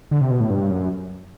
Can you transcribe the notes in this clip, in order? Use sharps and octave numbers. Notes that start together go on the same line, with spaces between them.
D3
C3
B2
A2
G2
F#2